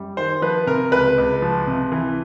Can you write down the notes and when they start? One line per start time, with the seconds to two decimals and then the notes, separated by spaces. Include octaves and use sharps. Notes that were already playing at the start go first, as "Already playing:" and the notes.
Already playing: F#2 G3
0.17 D#3 C5
0.42 F3 B4
0.67 C3 A#4
0.91 C#2 B4
1.18 C#2
1.42 F3
1.67 C3
1.92 E3